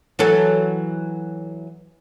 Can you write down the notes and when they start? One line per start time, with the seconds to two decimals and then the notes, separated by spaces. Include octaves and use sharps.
0.19 E3 F#3 A4